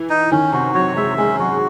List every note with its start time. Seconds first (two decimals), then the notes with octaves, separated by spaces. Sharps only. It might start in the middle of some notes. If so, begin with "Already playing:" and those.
Already playing: E3
0.10 D#4
0.32 D#3 C#4
0.52 C3 F#4
0.74 F#3 C#5
0.96 G#3 E5
1.18 G#3 C#4
1.39 F#3 F#4